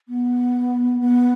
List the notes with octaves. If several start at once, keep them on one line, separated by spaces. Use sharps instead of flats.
B3
B3